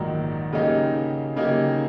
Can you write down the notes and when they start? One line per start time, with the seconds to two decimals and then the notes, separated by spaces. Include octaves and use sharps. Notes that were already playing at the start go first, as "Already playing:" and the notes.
Already playing: A#1 G#2 D#3 F#3
0.53 C#3 F#3 A#3 D#4 G4
1.36 C#3 F#3 A#3 D#4 G4